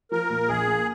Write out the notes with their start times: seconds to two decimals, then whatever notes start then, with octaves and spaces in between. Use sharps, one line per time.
0.12 F3 A#4
0.30 A#2
0.48 A#1 G#4
0.67 A#3